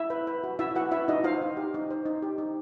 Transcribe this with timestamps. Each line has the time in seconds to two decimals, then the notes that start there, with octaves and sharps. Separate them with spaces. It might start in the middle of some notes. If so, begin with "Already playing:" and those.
Already playing: E4 E5
0.10 B4
0.27 B4
0.44 F#4
0.59 E4 F#4 E5
0.75 F#4 B4 F#5
0.91 E4 B4 E5
1.08 D#4 F#4 D#5
1.24 F4 C5 F5
1.42 D#4
1.57 G4
1.74 D#4
1.91 C5
2.06 D#4
2.23 G4
2.38 D#4